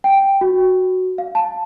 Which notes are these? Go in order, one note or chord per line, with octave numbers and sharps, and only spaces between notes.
G5
F#4
F5
A5